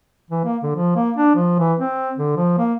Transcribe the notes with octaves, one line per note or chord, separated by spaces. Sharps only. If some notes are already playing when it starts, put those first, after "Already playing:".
E3
A#3
D3
F3
A#3
D4
F3
E3
C4
D3
F3
A#3